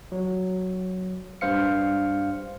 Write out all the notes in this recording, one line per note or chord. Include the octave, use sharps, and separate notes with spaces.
F#3
G2 C5 F5 C#7